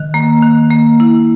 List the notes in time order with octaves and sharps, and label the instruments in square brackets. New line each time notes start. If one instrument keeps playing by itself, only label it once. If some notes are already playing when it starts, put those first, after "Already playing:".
Already playing: [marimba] D#3
A#3
D#3
A#3
E4